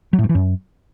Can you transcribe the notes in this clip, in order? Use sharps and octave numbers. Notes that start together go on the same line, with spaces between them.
F#3
A2
G2
E3
F#2